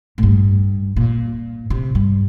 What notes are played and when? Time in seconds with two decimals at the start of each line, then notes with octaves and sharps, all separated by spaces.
0.18 A2
0.23 G2
0.96 A#2
1.70 C3
1.95 G2